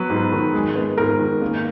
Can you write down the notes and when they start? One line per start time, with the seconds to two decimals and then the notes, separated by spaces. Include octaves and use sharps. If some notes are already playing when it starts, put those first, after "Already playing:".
Already playing: F#3 B3 B4
0.10 G#2
0.32 D#3
0.53 G#3
0.76 B3
0.98 G#2 A#4
1.19 D#3
1.41 A#3